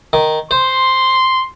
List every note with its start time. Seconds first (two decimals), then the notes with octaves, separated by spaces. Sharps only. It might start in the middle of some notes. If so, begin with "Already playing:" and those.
0.13 D#3
0.51 C5 C6